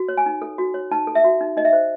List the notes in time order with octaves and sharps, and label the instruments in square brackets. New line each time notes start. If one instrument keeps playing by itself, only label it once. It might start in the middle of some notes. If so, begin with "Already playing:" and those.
Already playing: [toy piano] F#4
C#5
G#5
D#4
A4
F#4
C#5
D#4 A5
A4
E5
F#4
D#4
D#4 D#5
E5
C5